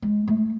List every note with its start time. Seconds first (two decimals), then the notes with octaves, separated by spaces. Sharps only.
0.02 G#3
0.28 A3